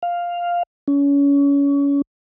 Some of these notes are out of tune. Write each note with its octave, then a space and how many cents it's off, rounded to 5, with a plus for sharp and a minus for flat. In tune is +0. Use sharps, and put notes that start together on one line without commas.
F5 +0
C#4 +30